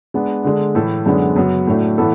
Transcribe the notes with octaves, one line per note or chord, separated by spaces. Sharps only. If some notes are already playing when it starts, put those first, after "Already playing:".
G#3 B3 D4
D3 G#3 D4
A2 E3 A3 E4 A4
F#2 D3 G#3 B3 D4
F#2 C#3 F#3 B3
A2 F#3 A3 D4
A2 E3 B3 E4 A4